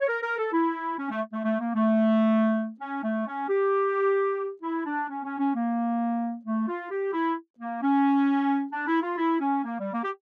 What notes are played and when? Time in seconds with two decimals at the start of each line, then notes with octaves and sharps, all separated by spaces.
0.01 C#5
0.08 A#4
0.22 A#4
0.38 A4
0.53 E4
0.98 C#4
1.10 A3
1.33 A3
1.43 A3
1.59 A#3
1.74 A3
2.80 C#4
3.03 A3
3.27 C#4
3.48 G4
4.62 E4
4.85 D4
5.08 C#4
5.24 C#4
5.39 C#4
5.54 A#3
6.45 A3
6.68 F4
6.91 G4
7.13 E4
7.59 A#3
7.82 C#4
8.72 D4
8.87 E4
9.02 F4
9.18 E4
9.40 C#4
9.64 A#3
9.79 G3
9.93 A#3
10.02 G4